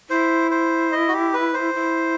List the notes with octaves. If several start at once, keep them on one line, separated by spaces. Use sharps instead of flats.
E4 C5
C5
D#5
F#4
G4
B4
C5
E4